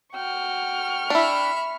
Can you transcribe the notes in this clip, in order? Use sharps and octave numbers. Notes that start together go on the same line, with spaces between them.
F#4 G5 C#6 F6
D4 E4 E5 B5